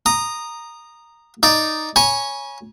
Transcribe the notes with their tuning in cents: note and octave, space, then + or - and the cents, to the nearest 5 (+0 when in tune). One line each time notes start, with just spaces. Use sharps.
A#5 +0 D#6 -15
D#4 +0 D5 +0
C#5 +0 G#5 +0 B5 -45